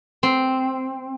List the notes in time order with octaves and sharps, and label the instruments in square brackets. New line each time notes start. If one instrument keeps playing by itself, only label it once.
[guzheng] C4